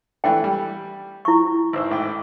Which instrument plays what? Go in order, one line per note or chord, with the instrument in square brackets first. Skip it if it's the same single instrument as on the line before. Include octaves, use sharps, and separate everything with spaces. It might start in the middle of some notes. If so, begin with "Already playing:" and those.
[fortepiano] E3 A3 D4 [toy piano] G5
[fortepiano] G3
[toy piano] E4 C#6
[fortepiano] G#1 C5 E6
A1 G#2 G5